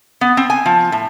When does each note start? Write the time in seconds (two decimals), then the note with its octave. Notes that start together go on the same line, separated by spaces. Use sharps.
0.21 B3
0.37 C4
0.50 G#5
0.66 F3
0.92 A2